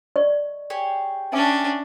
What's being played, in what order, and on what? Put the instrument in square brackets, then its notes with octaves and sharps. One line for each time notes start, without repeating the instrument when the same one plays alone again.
[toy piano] D5 D#5 C#6
[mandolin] G4 G#4 C#5
[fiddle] C#4 D4 [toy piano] E5 G#5 D6